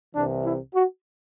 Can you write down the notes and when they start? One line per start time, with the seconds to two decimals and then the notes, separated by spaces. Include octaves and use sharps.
0.16 C2 C3 E3 D4
0.45 E4
0.75 F#4